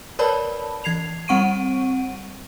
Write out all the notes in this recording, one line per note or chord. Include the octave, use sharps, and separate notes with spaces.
A#4 B4 C#5 D5 A5 B5
E3 G#6 C7 F7
G3 C4 F#5 C#6 D7 D#7